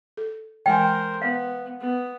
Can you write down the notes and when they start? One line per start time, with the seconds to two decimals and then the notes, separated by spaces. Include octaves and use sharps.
0.17 A4
0.66 E3 G#3 A#4 C5 G5 G#5
1.22 B3 F5
1.81 B3